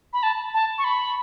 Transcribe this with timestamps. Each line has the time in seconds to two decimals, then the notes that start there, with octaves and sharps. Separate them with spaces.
0.13 B5
0.23 A5
0.54 A5
0.78 C#6
0.84 B5